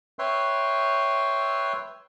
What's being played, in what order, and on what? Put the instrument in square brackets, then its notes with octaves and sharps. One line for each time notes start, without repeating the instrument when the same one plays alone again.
[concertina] B4 C#5 E5 G5 C6